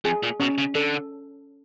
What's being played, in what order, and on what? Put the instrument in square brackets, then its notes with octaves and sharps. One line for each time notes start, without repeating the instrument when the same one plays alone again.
[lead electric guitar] F2 [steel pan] G#4
[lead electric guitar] A#2
[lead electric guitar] B2 [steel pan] C#4
[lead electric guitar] C#3
[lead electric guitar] D3 [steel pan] A4